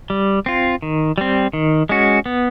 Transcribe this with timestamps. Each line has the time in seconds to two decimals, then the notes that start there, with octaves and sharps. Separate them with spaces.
0.10 G3
0.46 C4 F4
0.82 D#3
1.18 G3 C4
1.53 D#3
1.89 G#3 C#4 F#4
2.26 B3